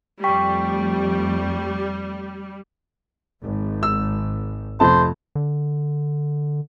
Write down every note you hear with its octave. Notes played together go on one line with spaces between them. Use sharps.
F2 G3 A3 G5 C#6 B6
G#1 G#2
E6
F2 C3 A3 C5 A5
D3